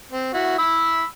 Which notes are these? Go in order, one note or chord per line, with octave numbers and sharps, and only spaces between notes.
C4
E4 F#4
B5 E6